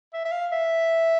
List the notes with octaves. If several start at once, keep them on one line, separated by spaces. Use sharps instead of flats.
E5
E5
F5
E5